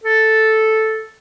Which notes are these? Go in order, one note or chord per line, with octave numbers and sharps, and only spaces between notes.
A4